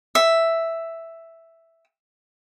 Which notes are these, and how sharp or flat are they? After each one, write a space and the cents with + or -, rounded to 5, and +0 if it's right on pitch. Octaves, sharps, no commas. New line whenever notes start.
E5 +0